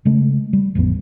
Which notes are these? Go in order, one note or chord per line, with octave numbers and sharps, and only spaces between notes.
C#3 G#3 A3
G3
A1 F2 F3 B3